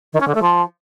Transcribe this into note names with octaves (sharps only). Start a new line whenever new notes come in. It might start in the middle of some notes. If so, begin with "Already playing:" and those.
D#3
C#4
D3
A3
F3